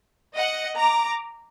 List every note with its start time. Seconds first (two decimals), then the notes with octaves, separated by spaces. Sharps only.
0.34 D#5 F#5
0.78 A#5 D6